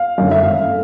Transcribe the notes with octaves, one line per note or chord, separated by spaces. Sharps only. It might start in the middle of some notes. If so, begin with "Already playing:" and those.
Already playing: F5
F#2 D3 F#3 A3
E5
G#1 F5
A3